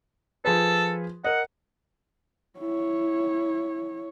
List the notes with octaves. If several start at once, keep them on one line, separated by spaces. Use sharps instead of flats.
F3 G#4 A4 B4
A#4 D#5 F#5
E4 C#5